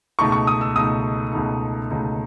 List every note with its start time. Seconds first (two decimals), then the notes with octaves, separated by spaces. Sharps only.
0.19 C#2 B2 A3 D#4 C#6
0.32 C#6
0.47 D#6
0.61 E6
0.75 C#2 B2 A3 D#4 D#6
1.33 C#2 B2 A3 D#4
1.90 C#2 B2 A3 D#4